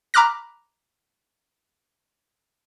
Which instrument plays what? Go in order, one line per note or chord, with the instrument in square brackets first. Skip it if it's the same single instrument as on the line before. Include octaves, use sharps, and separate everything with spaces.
[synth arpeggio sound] A#5 B5 D6 F6 F#6 A#6